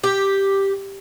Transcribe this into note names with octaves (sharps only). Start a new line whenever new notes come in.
G4